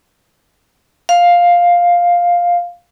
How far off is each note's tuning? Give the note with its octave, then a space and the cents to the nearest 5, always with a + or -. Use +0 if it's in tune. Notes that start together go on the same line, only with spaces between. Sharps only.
F5 +5